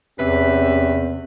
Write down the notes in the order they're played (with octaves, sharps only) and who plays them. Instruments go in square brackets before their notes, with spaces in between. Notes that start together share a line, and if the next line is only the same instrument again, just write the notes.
[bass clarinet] E2 [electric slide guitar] C3 [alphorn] C#4 [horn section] G4 B4 E5